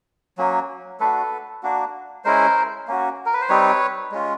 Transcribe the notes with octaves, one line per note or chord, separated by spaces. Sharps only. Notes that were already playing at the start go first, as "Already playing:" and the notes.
F#3 A#3 C#4
A3 D4 F#4 A4 B4
A#3 D4 F#4
G#3 C#4 E4 A#4 C5
A#3 C#4 F#4
A#4
B4
C5
G3 C4 D#4 B4 C#5
G#3 C#4 F4